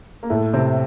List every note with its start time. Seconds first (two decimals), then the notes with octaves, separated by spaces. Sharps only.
0.23 A#3
0.30 A2 A3
0.53 C3 C4